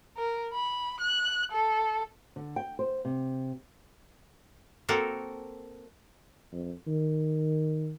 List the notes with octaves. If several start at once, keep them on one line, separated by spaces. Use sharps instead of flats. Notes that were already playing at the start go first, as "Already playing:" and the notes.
A#4
B5
F#6
A4
D3
G5
C5
C3
A#3 C4 F#4 A4 A#4 C5
F2
D#3